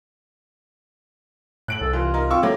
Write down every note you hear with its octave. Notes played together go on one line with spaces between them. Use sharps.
A2 F#6 D7 F#7
C2 A4
E3 F4
D#4 A#4
C4 F4 C#6 D6 E6
A2 F#3 A#3 D6